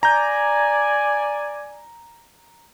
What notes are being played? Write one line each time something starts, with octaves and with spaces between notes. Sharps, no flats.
D5 G#5 A#5 G6